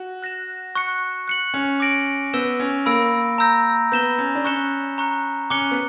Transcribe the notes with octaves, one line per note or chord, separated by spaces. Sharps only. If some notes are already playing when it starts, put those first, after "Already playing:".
Already playing: F#4
F#6 A#6 E7
C#6 F#6 C#7
F#6 C#7 F#7
C#4
D6 A#6 D7 F#7
B3 E6 G6 A#6 E7 G7
C#4
A#3 B5 E6 A#6 D7
A#5 E6 G6 A#6
B3 G6 A#6 E7 G7
C#4
D4
C#4 C#6 F#6 C#7 E7 G7
A#5 C#6 F#6 C#7
C#4 D6 F#6 C#7 G7
B3